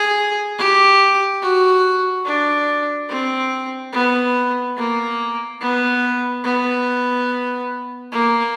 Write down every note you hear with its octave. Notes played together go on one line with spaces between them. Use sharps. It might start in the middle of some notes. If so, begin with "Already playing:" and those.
Already playing: G#4
G4
F#4
D4
C4
B3
A#3
B3
B3
A#3